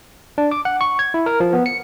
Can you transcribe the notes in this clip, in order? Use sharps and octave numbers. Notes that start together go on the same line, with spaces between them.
D4
D6
F#5
C#6
G#6
E4
A#4
F3
B3
C#7